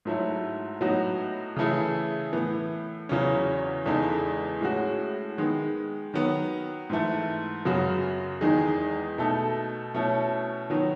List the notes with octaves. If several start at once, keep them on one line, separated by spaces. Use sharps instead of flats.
G#2 F#3 A3 E4
A2 F#3 B3 D#4 F#4
C#3 E3 A3 E4 G#4
A2 E3 B3
E2 C#3 F#3 C#4
E2 C#3 G#3 D#4 A4
A2 G#3 C#4 F#4
D#3 G#3 B3
D#3 F#3 B3
G#2 E3 A3
F#2 C#3 F#3 B3 F#4
E2 D#3 G#3 D#4 G#4
B2 A3 D#4 A4
B2 A3 C#4 E4
D#3 F#3 B3